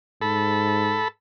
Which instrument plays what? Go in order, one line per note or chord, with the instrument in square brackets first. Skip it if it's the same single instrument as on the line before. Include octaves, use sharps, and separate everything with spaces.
[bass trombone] G#2 [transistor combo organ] A4 B5